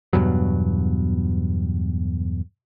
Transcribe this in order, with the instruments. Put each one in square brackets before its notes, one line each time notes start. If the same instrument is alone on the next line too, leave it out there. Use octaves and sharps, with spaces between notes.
[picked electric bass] E2 G2 B2 F#3